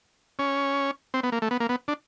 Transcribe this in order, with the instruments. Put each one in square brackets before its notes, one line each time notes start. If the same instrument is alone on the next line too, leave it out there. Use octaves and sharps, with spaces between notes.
[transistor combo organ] C#4
C4
B3
A#3
A3
B3
A#3
B3
D4